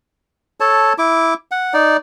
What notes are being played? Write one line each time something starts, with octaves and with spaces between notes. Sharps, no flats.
A4 C#5 A5
E4 D6
F#5
D#4 D5